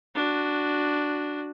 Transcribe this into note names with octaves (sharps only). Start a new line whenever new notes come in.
D4 F#4